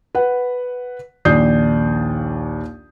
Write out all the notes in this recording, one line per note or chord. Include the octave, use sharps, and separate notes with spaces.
B4 F#5
A#1 D#2 D5 D#6 G6 C7